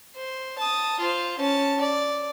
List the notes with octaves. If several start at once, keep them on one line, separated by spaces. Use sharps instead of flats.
C5
A5 D#6
F4 C5
C#4 A5
D5